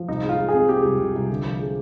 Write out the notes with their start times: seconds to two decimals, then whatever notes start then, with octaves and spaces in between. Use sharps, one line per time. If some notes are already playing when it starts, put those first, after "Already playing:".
Already playing: F3
0.08 C2 D#4
0.24 G#3
0.29 F4
0.38 G#3
0.49 G#4
0.54 C3
0.69 G#3 G4
0.84 C2
0.99 C2
1.15 C2
1.30 D3
1.44 F3
1.60 G#3